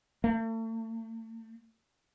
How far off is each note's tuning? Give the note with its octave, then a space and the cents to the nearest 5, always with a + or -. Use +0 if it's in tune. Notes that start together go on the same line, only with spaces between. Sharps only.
A3 +40